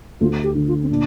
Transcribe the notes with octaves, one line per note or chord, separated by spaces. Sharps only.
D2 F4
G4
D3
F4
C4
A#2 D4